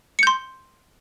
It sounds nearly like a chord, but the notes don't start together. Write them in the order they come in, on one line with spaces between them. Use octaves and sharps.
C#7 G6 C6